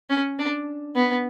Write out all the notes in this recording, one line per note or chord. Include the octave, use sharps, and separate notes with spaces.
C#4
D4
B3